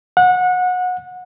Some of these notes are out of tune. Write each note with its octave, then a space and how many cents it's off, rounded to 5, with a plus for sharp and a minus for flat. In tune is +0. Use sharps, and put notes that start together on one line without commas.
F#5 -25